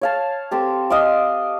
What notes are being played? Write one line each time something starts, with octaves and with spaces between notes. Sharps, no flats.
C#5 F5 A5
C4 G4 A4
D#5 F5 C6 D6